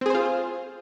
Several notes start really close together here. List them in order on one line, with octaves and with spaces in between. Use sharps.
C4 G#4 C5 F4